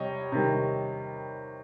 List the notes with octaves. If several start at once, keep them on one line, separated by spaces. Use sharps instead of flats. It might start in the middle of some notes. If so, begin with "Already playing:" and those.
Already playing: C3 G3 C#5 D#5
C3 D#3 G3